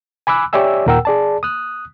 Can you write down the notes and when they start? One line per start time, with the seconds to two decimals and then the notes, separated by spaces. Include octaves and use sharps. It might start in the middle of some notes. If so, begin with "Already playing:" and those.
0.27 G#5 B5 D6 E6 F#6
0.53 G4 C#5 D5 E5 G#5 E6
0.86 D#2 A#2 A#4 F#5 G5 E6
1.05 G#4 D5 A5
1.43 D#6 F#6